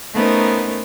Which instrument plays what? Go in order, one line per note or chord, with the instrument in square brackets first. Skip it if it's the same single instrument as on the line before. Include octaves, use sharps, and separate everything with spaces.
[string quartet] A3 B3 C#4 D#4 A#4 C5